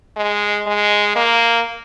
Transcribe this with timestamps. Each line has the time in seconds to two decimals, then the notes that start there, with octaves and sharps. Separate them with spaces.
0.17 G#3
0.67 G#3
1.16 A#3